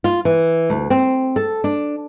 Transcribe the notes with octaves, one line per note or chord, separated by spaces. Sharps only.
F4
E3
D2
C4
A4
D4